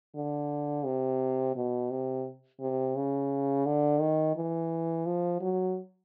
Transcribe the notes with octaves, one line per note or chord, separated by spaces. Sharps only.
D3
C3
B2
C3
C3
C#3
D3
D#3
E3
F3
F#3